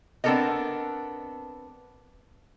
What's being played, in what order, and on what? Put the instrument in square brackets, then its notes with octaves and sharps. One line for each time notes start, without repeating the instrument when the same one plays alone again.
[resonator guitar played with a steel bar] B3 C4 D4 A4 A#4 D#5